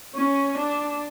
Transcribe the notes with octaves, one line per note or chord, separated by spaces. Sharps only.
C#4
D4